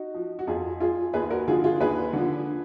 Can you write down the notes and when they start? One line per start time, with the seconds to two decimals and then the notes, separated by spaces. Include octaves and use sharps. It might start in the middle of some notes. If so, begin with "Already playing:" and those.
Already playing: D#4 F#4
0.14 F3
0.39 F#4
0.47 F2 F4 G#4
0.80 F3 F4 G#4
1.13 D#2 G#4 B4
1.30 F#4 A#4
1.48 D3 F3 F4 G#4
1.64 F4 G#4
1.80 D#2 G#4 B4
2.13 D3 F3